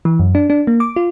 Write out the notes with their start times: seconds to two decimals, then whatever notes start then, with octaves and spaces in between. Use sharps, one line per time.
0.05 E3
0.19 F#2
0.35 D4
0.50 D4
0.67 A#3
0.80 D6
0.96 F4